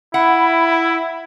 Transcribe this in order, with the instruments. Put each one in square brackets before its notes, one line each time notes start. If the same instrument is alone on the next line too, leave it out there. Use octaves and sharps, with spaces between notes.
[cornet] E4 [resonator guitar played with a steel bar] F#5 [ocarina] B5